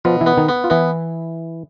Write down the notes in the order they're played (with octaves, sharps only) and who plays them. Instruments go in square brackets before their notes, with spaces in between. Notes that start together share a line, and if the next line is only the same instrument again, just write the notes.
[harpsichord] B2 [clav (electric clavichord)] F3 F4
[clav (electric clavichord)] E3 E4
[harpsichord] B3
[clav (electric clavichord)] D#3 D#4
[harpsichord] B3
[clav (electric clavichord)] F4
[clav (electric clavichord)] E3 E4 [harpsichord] B3